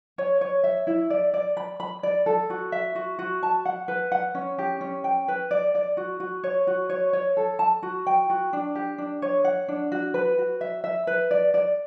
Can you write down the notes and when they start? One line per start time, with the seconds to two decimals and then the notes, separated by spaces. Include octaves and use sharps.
0.18 C#5
0.41 C#5
0.64 E5
0.87 E4
1.10 D5
1.34 D5
1.57 B5
1.80 B5
2.03 D5
2.26 A4
2.50 F#4
2.72 E5
2.95 F#4
3.19 F#4
3.43 A5
3.65 F#5
3.88 B4
4.12 F#5
4.35 C#4
4.58 G4
4.81 C#4
5.04 G5
5.28 B4
5.51 D5
5.75 D5
5.97 F#4
6.20 F#4
6.44 C#5
6.67 F#4
6.89 C#5
7.13 C#5
7.37 A4
7.59 A5
7.83 F#4
8.07 G5
8.30 F#4
8.53 D4
8.75 G4
8.98 D4
9.22 C#5
9.45 F#5
9.68 D4
9.92 F#4
10.14 B4
10.38 F#4
10.61 E5
10.84 E5
11.07 B4
11.31 D5
11.54 D5